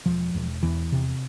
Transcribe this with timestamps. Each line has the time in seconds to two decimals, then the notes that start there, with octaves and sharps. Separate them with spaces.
0.06 E1 F3
0.34 E1
0.63 E2 E3
0.92 C3